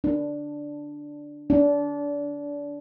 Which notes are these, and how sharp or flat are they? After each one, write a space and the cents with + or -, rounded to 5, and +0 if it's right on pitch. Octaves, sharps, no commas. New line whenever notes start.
D4 +0
D4 -25